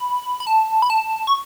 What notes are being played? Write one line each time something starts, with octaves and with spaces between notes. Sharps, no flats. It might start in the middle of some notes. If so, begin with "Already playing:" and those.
Already playing: B5
B5
A5
B5
A5
C#6